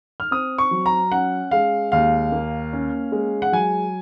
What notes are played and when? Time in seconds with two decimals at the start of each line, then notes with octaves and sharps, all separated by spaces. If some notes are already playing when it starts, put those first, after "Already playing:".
0.20 F6
0.31 C4 D#6
0.58 C#6
0.71 F#3
0.86 A#5
1.12 C#4 F#5
1.51 G#3 F5
1.92 D#2 F5
2.32 A#3
2.73 C#4
3.12 G#3
3.42 F#5
3.52 F#3 G#5